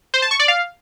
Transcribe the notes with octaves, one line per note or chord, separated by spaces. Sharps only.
C5
A5
C#6
D5
F5